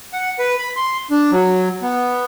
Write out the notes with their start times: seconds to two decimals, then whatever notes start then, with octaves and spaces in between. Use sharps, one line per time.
0.13 F#5
0.39 B4
0.59 B5
0.76 C6
1.11 D4
1.32 F#3
1.82 B3